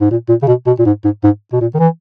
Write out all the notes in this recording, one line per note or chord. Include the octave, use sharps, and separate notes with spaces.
G#2
A#2
A#2
C#3
B2
B2
A#2
G#2
G#2
G#2
B2
A#2
D#3
E3